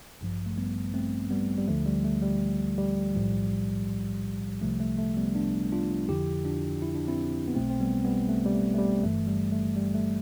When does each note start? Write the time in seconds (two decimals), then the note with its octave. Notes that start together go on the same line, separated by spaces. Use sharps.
0.21 A1 G2 F3
0.46 A3
0.57 G3 B3
0.94 A3 C4
1.30 G3 B3
1.58 G3
1.68 D2 D3 F3 A3
1.86 G3
2.04 A3
2.22 G3
2.78 G3
3.15 B1 A2 F3
4.61 C2 C3 F3 A3
4.80 A3
4.98 A3
5.17 G3 B3
5.35 B3 D4
5.72 D4 F4
6.08 F2 D3 F3 E4 G4
6.45 D4 F4
6.82 E4
6.95 D4
7.08 C4 E4
7.47 B3
7.55 B1 B2 A3 C4
7.70 C4
7.80 G3 B3
8.05 G3 B3
8.29 A3
8.46 G3
8.54 A3
8.74 A3
8.78 G3
9.03 G1 G2 E3 A3
9.27 G3
9.52 A3
9.76 G3
9.94 A3